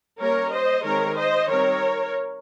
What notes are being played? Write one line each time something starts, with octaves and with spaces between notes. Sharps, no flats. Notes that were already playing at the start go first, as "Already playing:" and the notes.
G3 A#3 C#4 A#4 C#5
C5 D#5
D#3 G#3 C4 A#4 C#5
C5 D#5
D#3 G3 C4 A#4 C#5